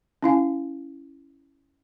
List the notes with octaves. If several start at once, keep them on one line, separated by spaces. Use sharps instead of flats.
C#4 E4 F5 G#5